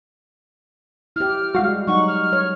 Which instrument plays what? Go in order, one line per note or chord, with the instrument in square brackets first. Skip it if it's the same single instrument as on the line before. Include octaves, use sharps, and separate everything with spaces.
[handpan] E4 G4 [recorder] F6
[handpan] G3 G#3 [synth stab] F#4 F5
[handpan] F#3 D#4 F#5 [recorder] C#6
[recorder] F6
[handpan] C#5